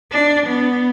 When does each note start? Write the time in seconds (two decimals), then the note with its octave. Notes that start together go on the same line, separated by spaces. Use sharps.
0.11 D4
0.47 B3